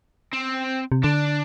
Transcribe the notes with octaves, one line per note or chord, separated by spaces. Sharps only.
C4
C3
D3 D4